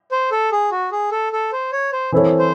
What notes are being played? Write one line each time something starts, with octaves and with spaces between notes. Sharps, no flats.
C5
A4
G#4
F#4
G#4
A4
A4
C5
C#5
C5
E3 C4 E4 A4 C#5
C5